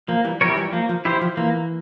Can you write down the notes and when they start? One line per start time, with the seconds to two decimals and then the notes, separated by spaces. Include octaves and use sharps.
0.08 F3 A#3
0.24 E3 G3
0.41 F3 E4 G4 A#4 C#5
0.57 E3 G3
0.73 F3 A#3
0.89 F3
1.05 E3 E4 G4 C5
1.21 F3
1.37 E3 A#3